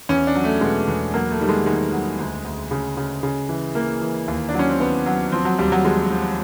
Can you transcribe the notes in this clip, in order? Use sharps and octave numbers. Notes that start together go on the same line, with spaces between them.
E2 C#4
D4
F#3
A3
B2 G#3
E2
F#3 A#3
A3
D#3 G3
G#3
D#3 G#3
F#3
D2
D2
C#3
C#3
C#3
E3
E3 A#3
E3
D#2
D4
F#3
C#4
C4
D#2 B3
F#3
F3 C4
F#3
D#2 G3
F#3
F3 G#3
F3